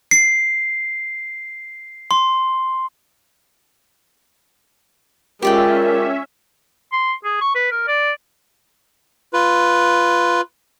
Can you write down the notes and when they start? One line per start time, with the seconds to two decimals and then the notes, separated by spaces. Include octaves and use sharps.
0.11 C7
2.11 C6
5.42 G#3 C#4 F4 G4 A#4 D5 E5 G5
6.92 C6
7.24 G#4
7.41 C#6
7.55 B4
7.71 A#4
7.88 D5
9.33 F4 B4